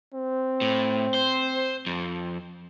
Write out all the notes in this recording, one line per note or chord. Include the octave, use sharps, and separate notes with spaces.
C4
A2
C5
F2